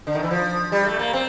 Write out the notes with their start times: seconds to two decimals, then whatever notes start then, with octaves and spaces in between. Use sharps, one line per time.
0.07 D3
0.15 D#3
0.23 E3
0.31 F3
0.72 G3
0.86 A3
0.99 A#3
1.13 C4